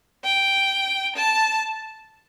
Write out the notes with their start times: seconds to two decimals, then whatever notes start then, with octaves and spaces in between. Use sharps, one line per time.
0.24 G5
1.16 A5